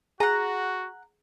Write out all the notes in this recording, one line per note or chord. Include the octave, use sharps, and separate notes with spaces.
F#4 G#4 F#5 A#5